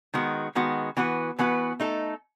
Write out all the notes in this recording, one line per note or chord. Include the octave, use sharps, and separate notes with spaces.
D#3 G#3 B3 F#4
D#3 G#3 B3 F#4
E3 B3 F#4 B4
E3 B3 F#4 B4
A3 D#4 A4